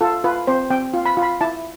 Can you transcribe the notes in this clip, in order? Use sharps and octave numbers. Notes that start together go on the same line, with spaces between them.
F4 A4
F4 B4
C4 C5
C4 G5
F4
B5
F4
B5
E4 A5